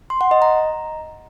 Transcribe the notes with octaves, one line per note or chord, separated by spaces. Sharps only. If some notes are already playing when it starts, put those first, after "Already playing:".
C6
F#5
D#5
A#5